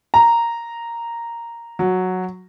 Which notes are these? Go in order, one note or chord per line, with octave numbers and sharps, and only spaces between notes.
A#5
F#3